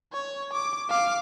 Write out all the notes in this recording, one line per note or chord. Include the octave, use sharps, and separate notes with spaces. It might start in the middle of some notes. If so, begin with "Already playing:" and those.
C#5
D6
F5 D6